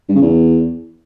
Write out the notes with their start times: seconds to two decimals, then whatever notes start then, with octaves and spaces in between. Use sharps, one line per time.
0.09 G2
0.15 C#3
0.22 E2